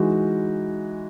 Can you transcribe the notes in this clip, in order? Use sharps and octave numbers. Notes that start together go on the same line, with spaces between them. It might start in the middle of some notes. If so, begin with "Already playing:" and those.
Already playing: E3 G#3 D#4 F#4